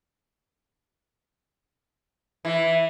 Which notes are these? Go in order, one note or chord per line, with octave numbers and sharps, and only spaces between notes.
E3